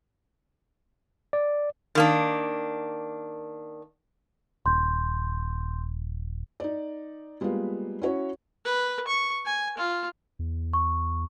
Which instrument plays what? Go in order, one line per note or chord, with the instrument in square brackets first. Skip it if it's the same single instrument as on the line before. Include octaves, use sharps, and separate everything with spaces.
[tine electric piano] D5
[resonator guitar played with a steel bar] D#3 A#3 D4
[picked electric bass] D#1 [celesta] C6 G6
[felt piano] D#4 D5
G3 G#3 A#3 B3 F4
C#4 E4 F#4 C#5
[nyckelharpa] B4
C#6
G#5
F4
[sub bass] E2
[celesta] C#6